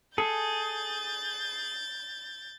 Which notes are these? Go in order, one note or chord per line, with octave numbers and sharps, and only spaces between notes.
G#4 A4 G6 A6